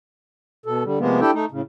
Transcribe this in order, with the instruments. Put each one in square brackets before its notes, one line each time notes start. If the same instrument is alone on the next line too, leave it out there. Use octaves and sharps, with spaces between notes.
[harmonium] B2 A4
D3 G3
C3 F3 G#3 A#3 B3
D4 E4 G4 A4 G5
A3 D#4
A2 C#3